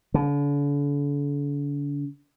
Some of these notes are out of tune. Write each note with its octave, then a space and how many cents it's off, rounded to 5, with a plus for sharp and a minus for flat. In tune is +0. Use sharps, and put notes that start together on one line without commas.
D3 -40